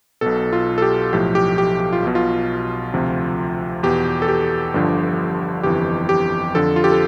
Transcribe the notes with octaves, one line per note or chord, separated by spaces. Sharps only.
B1 B2 A4
F4
A4
G4
B1 A2 F3 G4
G4
G4
G4
F4
B1 B2
F4
D2 C3 F3
E2 B2 G4
A4
G4
G1 G2 D3 F3
G1 F2 E3 G4
G4
F2 D3 F3 A4
F4
G4
A4